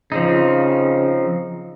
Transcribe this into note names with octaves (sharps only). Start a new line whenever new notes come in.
C#3 F3 C4 D#4